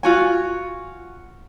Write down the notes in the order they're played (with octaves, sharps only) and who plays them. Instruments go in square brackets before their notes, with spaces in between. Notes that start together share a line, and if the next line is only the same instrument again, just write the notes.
[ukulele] F4 F#4 G#5